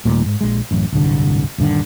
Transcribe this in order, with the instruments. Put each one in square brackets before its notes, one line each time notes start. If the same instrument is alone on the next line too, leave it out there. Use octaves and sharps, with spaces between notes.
[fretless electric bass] D#2 A#2 G3 A3
G#2
A#1 G#3
A1 F#2
D1 G1 C2 D3
D#1 G2 D3 D#3